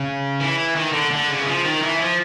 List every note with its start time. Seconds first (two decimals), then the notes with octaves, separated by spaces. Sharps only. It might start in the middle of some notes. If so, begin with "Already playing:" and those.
Already playing: C#3
0.40 E3
0.76 D#3
0.93 D3
1.11 D3
1.28 C#3
1.41 E3
1.46 F3
1.64 D#3
1.82 E3
2.00 F3